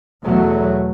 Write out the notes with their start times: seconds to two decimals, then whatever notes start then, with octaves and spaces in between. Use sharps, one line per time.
0.24 E2 B2 F#3 A3